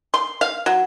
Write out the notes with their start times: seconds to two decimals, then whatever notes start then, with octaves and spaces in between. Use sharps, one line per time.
0.14 C6
0.41 F5
0.66 F#3